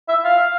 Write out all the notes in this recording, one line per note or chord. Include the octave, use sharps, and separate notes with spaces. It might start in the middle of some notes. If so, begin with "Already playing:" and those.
E5
F5